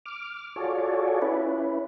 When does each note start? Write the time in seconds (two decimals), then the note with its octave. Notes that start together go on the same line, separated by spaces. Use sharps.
0.06 D6 F6
0.56 F4 F#4 G#4 A4 C#5 D5
1.22 C#4 E4 B4